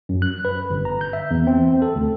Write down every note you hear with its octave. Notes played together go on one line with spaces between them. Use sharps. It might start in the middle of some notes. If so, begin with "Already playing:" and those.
F#2
F#6
B4
G1
A#5
G6
E5
E2
C4
A4
D2